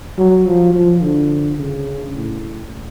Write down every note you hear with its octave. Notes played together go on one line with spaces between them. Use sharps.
F#3
F3
F3
D3
C#3
A2